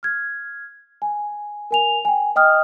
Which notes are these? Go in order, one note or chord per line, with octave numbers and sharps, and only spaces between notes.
F6 G#6
G#5
A#4 G#5 F7
G5 G#5
D#5 G5 D#6 F6